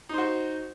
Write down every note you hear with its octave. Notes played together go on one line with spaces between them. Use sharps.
D#4 F#4 C5